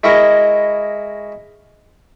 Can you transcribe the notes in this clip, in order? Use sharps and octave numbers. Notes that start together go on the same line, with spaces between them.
G#3 E4 F#4 A#4 D#5